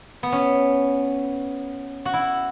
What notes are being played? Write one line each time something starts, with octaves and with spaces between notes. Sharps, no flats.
B3
C#4
F#4
E4